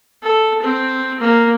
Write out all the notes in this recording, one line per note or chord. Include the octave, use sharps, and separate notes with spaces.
A4
C4
A#3